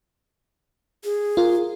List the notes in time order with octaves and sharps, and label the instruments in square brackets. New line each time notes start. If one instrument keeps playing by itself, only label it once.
[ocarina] G#4
[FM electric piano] F4 A#4